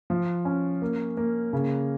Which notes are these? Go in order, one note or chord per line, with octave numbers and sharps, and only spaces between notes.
F3
C#4
A#3
A#3
C#3